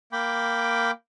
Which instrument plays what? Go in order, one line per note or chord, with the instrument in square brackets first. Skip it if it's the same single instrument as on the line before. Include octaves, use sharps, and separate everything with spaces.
[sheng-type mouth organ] A#3 G5 B5 D6